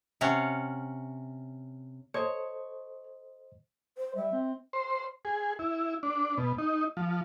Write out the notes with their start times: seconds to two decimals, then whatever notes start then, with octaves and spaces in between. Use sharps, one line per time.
0.21 C3 C#4 F5 F#5
2.14 A4 C5 C#5 D#5
3.97 C5
4.16 G3 E5
4.33 C4
4.73 C5
5.25 G#4
5.59 E4
6.03 D4
6.37 B2
6.58 D#4
6.97 F3